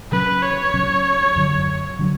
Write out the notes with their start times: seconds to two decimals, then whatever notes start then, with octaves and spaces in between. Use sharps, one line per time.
0.12 C#3 F#3 C#4 B4
0.42 C#5
0.74 C#3 F#3 C#4
1.36 F#2 D3 F#3
1.99 D3 F#3